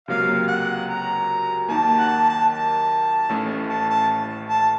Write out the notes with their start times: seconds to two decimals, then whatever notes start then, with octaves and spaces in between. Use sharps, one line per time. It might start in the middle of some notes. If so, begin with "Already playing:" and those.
0.08 C#2 C3 F#3 A#3 F5
0.48 F#5
0.89 A#5
1.69 D#2 D#3 A#3 A5
1.98 F#5
2.08 A5
2.29 A5
2.48 A5
3.29 A1 A2 A3 C#4
3.69 A5
3.90 A5
4.49 A5